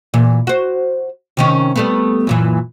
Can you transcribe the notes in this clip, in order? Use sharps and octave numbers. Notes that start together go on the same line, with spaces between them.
A#2 E3
F#4 C5
C3 D#3 C#4
G3 A3 B3
F#2 A#2 E3